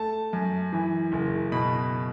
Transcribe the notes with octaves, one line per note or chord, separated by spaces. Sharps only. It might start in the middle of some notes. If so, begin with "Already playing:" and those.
Already playing: A3 A5
F#2
E3
F#1
B2 B5